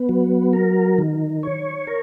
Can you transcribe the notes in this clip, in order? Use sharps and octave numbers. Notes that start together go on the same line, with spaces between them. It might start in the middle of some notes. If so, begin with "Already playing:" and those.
Already playing: B3
F#3
A#4
D#3
C#5
A#4